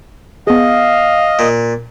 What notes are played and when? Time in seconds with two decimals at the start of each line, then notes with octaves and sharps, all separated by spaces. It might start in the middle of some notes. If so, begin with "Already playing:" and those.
0.47 B3 G#4 D#5 F5
1.39 A#2